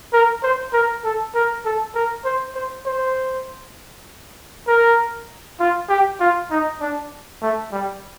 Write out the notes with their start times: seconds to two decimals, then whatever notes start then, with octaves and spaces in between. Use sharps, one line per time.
0.13 A#4
0.43 C5
0.73 A#4
1.04 A4
1.35 A#4
1.65 A4
1.95 A#4
2.25 C5
2.55 C5
2.86 C5
4.68 A#4
5.60 F4
5.89 G4
6.20 F4
6.51 D#4
6.81 D4
7.42 A3
7.72 G3